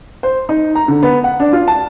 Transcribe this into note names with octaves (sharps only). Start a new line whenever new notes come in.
C5
D#4
A#5
D3
B3
F#5
D4
F4
A5